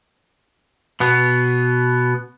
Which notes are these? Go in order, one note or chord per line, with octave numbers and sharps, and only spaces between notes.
B2 B3